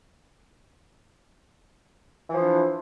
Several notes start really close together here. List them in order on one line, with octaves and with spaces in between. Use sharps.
E3 F3 D4